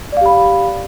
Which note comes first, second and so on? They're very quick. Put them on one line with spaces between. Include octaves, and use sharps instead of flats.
D5 F5 G4 B5